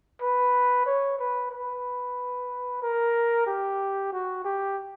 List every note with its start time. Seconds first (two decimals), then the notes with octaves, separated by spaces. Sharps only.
0.21 B4
0.86 C#5
1.19 B4
1.51 B4
2.82 A#4
3.47 G4
4.13 F#4
4.44 G4